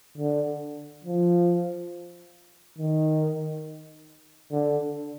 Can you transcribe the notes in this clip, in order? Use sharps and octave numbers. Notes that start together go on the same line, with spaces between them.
D3
F3
D#3
D3